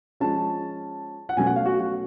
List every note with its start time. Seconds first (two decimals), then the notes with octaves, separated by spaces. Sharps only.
0.20 F3 G#3 C#4 A5
1.29 F#5
1.37 B2 F#3 A3 C#4 G#5
1.46 F#5
1.56 F5
1.66 F#4
1.80 F#4